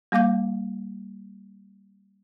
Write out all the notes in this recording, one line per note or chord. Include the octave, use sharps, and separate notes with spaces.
G3 A#3 F5 D6 G6